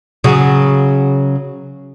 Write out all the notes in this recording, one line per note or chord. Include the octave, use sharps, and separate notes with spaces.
C#3 F#3